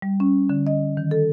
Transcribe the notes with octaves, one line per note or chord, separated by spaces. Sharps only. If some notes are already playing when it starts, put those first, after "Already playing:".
G3
C#4
D3
D#5
D#3
A4